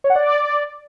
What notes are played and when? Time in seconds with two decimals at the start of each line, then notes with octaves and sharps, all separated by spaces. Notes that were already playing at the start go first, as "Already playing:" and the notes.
0.04 C#5
0.10 F#5
0.16 D5